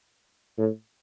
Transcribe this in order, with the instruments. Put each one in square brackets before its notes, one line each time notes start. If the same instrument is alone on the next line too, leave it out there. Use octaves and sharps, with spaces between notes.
[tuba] A2